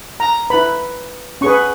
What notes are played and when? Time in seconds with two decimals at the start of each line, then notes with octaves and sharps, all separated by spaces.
0.20 A#5
0.50 E4 B4 B5
1.41 C#4 G#4 B4 C#6